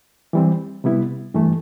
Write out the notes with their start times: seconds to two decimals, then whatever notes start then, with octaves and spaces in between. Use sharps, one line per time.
0.33 E3 G3 C4
0.84 C3 G3 B3 E4
1.34 G2 E3 A3